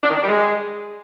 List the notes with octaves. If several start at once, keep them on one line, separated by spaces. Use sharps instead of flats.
D4
D#3
D4
G3
G#3